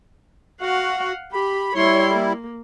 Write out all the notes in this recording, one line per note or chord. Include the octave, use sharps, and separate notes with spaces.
F#4 F5 F#5
G4 B5
G3 E4 C#5 C6
A#3